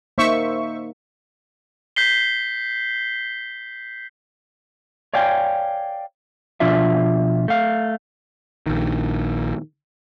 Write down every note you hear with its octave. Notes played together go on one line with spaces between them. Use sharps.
A#3 D#4 C5 E5 C#6
G6 B6 C7 G7
C#5 D5 F5 G5 G#5
B2 F3 D4 F4 E5
A3 F5
A#1 D#3